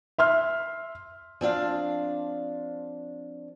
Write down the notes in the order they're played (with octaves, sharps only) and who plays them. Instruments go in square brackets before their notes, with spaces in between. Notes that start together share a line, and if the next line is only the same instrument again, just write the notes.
[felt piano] E5 C6 F6
[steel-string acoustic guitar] F3 C4 D4 F5